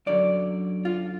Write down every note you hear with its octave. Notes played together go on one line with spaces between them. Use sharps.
F#2 D3 F#3 D5
F4